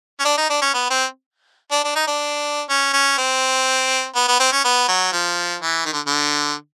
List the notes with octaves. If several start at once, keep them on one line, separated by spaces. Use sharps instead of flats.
C#4
D4
D#4
D4
C#4
B3
C4
D4
D4
D#4
D4
C#4
C#4
C4
B3
B3
C4
C#4
B3
F#3
F3
E3
D#3
D3
D3